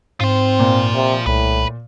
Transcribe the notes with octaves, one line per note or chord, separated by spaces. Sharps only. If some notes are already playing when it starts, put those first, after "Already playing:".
G#2 C4 F4 C5
A#2
C3
C2 A2 B4